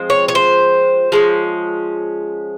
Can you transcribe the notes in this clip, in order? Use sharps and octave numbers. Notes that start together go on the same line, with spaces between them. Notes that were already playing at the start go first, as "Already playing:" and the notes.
Already playing: F3 G#3 C4
C#5
C#5
C5
F3 G#3 C#4